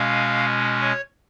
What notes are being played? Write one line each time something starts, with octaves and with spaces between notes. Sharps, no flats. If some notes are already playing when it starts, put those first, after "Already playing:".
Already playing: B2 G#3 C#4 F5
C#5